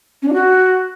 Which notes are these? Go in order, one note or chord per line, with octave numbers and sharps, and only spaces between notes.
C#4
D4
F#4